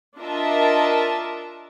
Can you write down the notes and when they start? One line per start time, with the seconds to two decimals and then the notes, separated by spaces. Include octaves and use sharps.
0.19 D4 F4 A#4 D#5 E5 A5